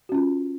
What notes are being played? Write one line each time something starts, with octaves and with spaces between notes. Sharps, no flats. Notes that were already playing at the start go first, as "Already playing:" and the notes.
C#4 F4 F#4